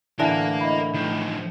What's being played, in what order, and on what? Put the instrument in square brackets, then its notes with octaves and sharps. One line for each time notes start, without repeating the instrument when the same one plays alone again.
[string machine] A2 [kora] D3 E3 [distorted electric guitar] A#4 F5 [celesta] A5
[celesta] D#5 E5 B5
[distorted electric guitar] D#3 F3